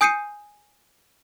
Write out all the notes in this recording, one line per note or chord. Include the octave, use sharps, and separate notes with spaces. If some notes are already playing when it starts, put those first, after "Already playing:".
G#5 D#6 G6 C7 C#7 D#7